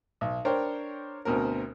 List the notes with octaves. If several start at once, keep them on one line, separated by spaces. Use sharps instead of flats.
B1
D4 A#4 C5 C#5 G5
D2 B2 C4 A#4